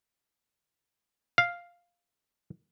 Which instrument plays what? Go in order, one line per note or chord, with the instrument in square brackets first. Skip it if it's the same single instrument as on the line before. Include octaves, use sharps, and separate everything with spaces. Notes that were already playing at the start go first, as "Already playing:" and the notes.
[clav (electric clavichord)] F5